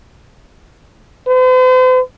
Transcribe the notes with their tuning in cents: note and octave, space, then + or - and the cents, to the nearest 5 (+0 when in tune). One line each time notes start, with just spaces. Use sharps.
C5 -45